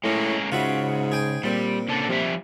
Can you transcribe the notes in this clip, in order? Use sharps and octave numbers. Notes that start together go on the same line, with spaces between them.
A2 G#3 A#3 C#4
G#2 C#3 F4 F#4 E5
G#4 G5 G#5
A#2 G3 C4
C#3 D4 A4
C3 F3 G3 E5